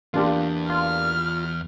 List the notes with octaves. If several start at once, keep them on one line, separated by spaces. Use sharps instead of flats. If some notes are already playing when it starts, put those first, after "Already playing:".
E2 A#3 D4 F4 G4
F4 F6